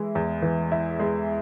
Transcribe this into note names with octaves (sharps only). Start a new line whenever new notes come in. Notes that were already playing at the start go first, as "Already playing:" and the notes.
Already playing: E3 G#3 E4
E2
E3
E4
G#3